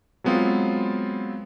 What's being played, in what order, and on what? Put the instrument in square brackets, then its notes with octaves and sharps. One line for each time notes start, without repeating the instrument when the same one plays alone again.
[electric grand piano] F#3 G#3 B3 C4 F4